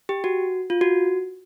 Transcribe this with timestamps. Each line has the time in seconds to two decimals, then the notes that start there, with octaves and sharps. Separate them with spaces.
0.09 G4
0.24 F#4
0.70 F4
0.81 F#4